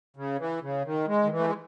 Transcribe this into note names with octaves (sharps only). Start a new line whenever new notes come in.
C#3
E3
C#3
D#3
G#3
D#3
E3
A3
G#3